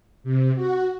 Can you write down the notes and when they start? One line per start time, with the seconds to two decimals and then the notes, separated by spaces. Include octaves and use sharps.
0.24 C3
0.56 F#4